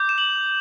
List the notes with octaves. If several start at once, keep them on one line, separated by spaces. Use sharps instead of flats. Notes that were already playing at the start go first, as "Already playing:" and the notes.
Already playing: D6 G6
E7
F#7